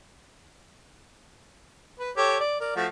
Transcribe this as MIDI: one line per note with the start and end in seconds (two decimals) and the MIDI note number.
2.00 2.11 71
2.17 2.38 67
2.17 2.38 69
2.17 2.38 73
2.40 2.58 74
2.60 2.73 70
2.60 2.73 74
2.76 2.86 53
2.76 2.86 57
2.76 2.86 66